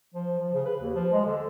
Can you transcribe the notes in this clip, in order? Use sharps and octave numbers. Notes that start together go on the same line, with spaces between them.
F3
F3
C#3
B4
D#2
F3
G#3
D3